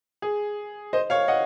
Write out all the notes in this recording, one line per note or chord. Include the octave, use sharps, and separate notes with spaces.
G#4
C5 D#5
C#5 F5
D#5 F#5